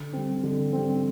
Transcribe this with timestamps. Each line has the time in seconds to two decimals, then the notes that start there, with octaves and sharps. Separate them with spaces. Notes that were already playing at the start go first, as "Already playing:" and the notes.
Already playing: D3
0.13 G3 C4
0.43 D3
0.73 G3 C4